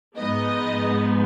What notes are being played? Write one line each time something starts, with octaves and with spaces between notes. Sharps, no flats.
G#2 F3 G#3 B3 D#4 D#5